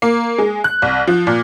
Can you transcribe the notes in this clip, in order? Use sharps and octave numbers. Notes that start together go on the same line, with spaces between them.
A#3
G#3
F#6
C2
F3
A#2